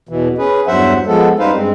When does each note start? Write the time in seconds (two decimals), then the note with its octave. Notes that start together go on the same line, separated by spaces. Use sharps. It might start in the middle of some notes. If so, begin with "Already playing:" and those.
0.09 E2 B2 E3
0.38 C#4 G#4 B4
0.67 E2 G2 F#3 C5 E5 F#5
1.07 F3 G#3 B3 A4
1.39 F#2 G3 D#4 B4 C5 F5
1.55 G2 G#3 C4